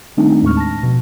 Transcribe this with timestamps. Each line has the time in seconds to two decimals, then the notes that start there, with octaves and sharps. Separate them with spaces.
0.17 D#3 G3 A3 C4 D4 D#4
0.42 D#2 A2 G#3 C#6 F6
0.57 A5 A#6
0.83 B2 F3